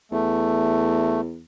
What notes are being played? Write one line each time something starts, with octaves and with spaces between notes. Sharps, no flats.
E2 A3